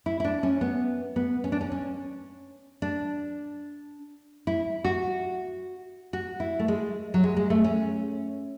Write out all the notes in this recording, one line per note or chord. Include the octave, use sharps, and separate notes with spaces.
E4
E4
D4
C#4
B3
B3
C#4
D4
C#4
C#4
D4
E4
F#4
F#4
E4
A3
G#3
F#3
G#3
G#3
A3
C#4